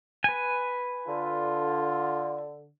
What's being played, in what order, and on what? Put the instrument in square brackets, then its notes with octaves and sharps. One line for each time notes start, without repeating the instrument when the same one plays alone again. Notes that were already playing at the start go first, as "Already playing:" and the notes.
[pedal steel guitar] B4 G#5
[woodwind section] D3 [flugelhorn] F4